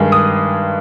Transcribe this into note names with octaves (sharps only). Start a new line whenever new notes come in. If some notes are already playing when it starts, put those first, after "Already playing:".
Already playing: G2 D#3 G#3
D#6